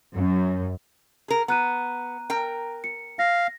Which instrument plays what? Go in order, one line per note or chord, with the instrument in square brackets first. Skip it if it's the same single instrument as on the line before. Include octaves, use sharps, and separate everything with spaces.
[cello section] F#2
[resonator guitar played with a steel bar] G#4 A#4
[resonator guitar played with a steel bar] B3 [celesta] A#5 F#6 D#7
[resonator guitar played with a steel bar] A#4 G5
[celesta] C#7
[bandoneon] F5 [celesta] A#6